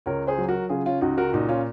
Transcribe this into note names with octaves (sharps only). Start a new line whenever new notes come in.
C#2 A#4 C#5
G#4 C5
F#3
F#4 A#4
C#3 F4 G#4
C#4 F4
C#2 D#4 F#4
F#4 A#4
A#2 D#4 F#4
C#4 F4